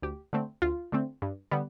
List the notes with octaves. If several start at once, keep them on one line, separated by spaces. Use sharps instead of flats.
D2 G4
D3 A3 C4
D2 F4
D3 A3 C4
G2
D3 G3 B3